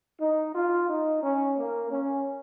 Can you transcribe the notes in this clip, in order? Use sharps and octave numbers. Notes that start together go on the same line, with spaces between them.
D#4
F4
D#4
C#4
A#3
C#4